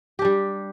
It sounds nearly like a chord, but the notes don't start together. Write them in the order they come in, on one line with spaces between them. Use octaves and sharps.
G4 D4 G3